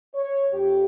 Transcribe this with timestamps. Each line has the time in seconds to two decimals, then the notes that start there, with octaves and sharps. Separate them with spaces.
0.15 C#5
0.51 F2 G4